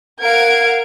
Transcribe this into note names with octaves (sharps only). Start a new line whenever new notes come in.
A#4 F5 F#5 G#6 D7